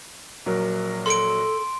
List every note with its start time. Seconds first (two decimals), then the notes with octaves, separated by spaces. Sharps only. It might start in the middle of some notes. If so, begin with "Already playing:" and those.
0.46 A#1 F#3 A#4
1.06 A4 C6 D7